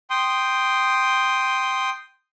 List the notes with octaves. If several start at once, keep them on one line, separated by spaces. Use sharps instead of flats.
G5 C6 D#6